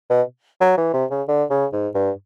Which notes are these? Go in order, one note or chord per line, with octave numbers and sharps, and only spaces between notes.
B2
F#3
E3
C3
C#3
D3
C#3
G#2
G2